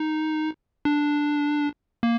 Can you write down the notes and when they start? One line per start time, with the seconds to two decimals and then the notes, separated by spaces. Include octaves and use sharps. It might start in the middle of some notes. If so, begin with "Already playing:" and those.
Already playing: D#4
0.85 D4
2.03 A#3